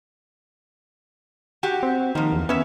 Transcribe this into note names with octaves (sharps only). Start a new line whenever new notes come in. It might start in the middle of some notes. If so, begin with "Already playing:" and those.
F#4 G4
C4
D#3 F3 A#3
E2
B3 C#4 E5